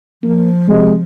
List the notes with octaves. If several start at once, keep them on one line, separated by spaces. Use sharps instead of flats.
F3 A#3
C3 G#3